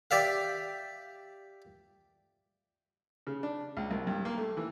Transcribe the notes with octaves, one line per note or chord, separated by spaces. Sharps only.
G4 D5 E5 F5
C#3
D4
C#2
C2
G2
A#3
A3
E3